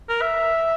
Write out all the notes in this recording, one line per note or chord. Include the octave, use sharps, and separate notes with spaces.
A#4
E5